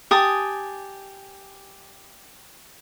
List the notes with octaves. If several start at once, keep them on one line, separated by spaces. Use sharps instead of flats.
G4 G#5 A5 D#6